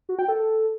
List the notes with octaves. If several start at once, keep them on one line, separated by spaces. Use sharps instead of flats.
F#4
G5
A4